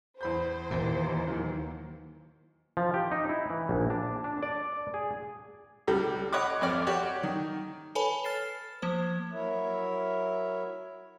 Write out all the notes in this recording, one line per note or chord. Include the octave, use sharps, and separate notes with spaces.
E2 C5 B5 G6
D#2 A#2 E3
D#3 E3 F#3
F3
G4
D#4
E4
E3
A#1
D4
D4
D5
G#4
C#2 G3
C#5 D#5 F#5 B5 C#6 D6
G#1 F2 D5 F6
F#4 G4 C#5 D5
D#3
A4 B4 C#5 G#5 A5 B5
F6 A6 C7 E7
F3 A#3 C5
F#3 E4 A#4 C#5 E5